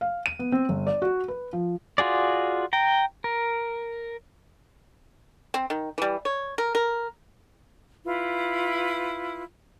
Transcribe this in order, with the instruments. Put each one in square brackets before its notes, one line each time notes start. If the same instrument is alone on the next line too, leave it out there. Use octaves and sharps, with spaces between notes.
[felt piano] F5
D#7
B3
C4
G1
D5
F#4
B4
F3
[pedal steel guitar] F4 F#4 G#4 D5
G5 A#5
A#4
[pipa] C4
D#3
E3 G3
C#5
A#4
A#4
[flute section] E4 F4 B4